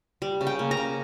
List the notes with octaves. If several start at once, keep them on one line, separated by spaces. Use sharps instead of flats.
G3
C#3
G5
A#3
A#5
C#3